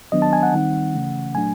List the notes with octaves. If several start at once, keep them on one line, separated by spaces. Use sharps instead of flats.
D#3 F#3 B3 D4 D#5
A5
G#5
F#5
D#3 G3 C4 D#4
C#3 E3 A3 C#4
A#2 F#3 A3 D4 G#5